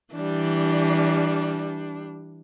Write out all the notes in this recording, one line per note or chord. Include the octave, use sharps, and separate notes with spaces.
E3 G3 D4